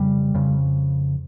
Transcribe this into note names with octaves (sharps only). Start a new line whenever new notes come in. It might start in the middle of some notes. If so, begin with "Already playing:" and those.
Already playing: F2 C#3 G3
F2 C#3